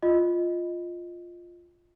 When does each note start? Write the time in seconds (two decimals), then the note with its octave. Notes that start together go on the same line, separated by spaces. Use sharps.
0.02 F4 D#5